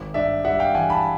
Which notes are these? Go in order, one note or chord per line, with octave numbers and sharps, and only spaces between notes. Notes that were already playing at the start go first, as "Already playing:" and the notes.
Already playing: G#1
G2 D5 E5
G3 E5 F#5
F5 G5
E3 F#5 G#5
A5 B5